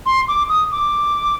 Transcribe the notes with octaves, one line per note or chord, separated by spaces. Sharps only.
C6
D6
D#6
D6